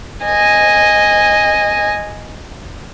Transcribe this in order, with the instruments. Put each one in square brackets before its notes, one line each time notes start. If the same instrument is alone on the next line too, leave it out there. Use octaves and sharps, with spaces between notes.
[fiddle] D#5 G#5